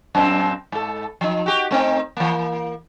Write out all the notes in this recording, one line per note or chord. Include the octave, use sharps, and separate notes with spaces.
F#2 A#2 C4
G#2 A4
F3 D#4
F#4 G4
A3 C4 D#4
E3 A#3